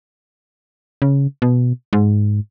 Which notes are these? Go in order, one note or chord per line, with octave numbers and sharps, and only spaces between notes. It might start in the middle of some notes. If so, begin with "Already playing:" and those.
C#3
B2
G#2